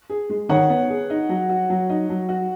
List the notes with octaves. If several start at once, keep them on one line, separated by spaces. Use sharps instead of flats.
G#4
G#3
D#3 C#5 F#5
B3
G#4
D#4
F#3
F#4
F#3
D#4
F#3
F#4